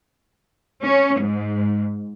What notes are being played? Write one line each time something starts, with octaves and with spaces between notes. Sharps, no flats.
C#4
G#2